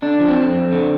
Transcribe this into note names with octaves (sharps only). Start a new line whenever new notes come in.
D3 D4
F3
C4
F2
F2
D3